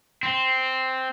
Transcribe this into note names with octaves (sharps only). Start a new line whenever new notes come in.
C4